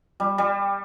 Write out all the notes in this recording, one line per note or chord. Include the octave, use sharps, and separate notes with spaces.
G3
G3